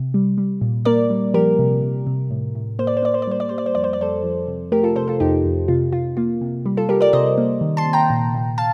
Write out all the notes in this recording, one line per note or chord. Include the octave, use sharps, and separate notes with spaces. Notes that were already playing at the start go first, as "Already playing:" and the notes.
Already playing: C3
G3
G3
A#2
A#3 A#4 D5
G3
F3 G4 A#4
C3
C3
C3
A2
A2
A#3 C5
D5
C5
A#3 D5
C5
D5
G3 C5
D5
G3 C5
D5
C5
F2 D5
C5
D5
F2 A4 C5
F3
C3
A3 G4 A#4
F4 A4
C3 A4 C5
F4 A4
F2 D#4 G4
F2
C3 F4
C3 F4
A#3 F4
C3
G3
F4 A4
G3 G4 A#4
A#4 D5
C3 C5 D#5
A#3
D#3
A5 C6
C3
G5 A#5
A#2
A#2
F5 A5